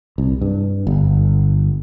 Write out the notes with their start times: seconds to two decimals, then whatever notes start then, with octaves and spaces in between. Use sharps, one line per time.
0.18 C2
0.41 G2
0.87 G1